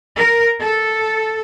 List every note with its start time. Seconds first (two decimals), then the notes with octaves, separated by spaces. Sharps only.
0.17 A#4
0.61 A4